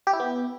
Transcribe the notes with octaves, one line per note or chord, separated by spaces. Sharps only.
G4
E4
B3